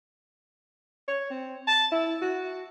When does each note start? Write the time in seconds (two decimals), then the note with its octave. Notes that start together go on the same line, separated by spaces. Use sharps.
1.08 C#5
1.30 C4
1.67 A5
1.92 E4
2.22 F#4